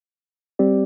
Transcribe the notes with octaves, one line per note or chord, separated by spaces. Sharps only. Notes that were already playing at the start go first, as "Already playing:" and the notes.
G3 C4 G4 D5